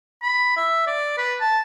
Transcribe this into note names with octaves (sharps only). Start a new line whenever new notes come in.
B5
E5
D5
B4
A5